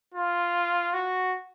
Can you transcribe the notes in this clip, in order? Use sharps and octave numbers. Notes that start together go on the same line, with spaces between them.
F4
F#4